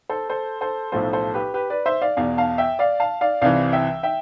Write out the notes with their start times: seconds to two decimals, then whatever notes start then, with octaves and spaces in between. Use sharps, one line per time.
0.09 A4 C5
0.30 A4 C5
0.61 A4 C5
0.92 B1 A2 F3 A4 C5
1.13 A4 C5
1.34 G4 B4
1.54 G4 B4
1.70 B4 D5
1.86 C5 E5
2.02 D5 F5
2.17 E2 B2 D5 F5
2.38 F5 A5
2.58 E5 G5
2.79 D5 F5
3.00 F5 A5
3.21 D5 F5
3.41 C2 C3 E3 D5 F5
3.73 E5 G5
4.03 E5 G5